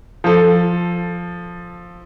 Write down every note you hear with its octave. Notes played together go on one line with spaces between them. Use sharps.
F3 A4